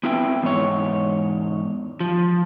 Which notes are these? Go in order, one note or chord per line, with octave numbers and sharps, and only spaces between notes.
B3 C4 E4 B4 E5 G5
E2 G#2 C#5
F3